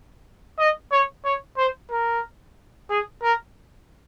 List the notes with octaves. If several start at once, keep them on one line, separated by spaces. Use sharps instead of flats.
D#5
C#5
C#5
C5
A#4
G#4
A#4